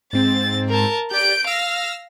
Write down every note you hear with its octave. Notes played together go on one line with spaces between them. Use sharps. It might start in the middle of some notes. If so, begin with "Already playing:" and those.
G#2 C4 A6
A#4 A5
G4 D5 G6 D7
F5 E6 F6 A#6